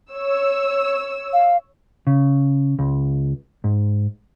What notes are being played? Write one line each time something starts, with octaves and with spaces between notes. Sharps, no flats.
C#5 E6
F5
C#3
C#2
G#2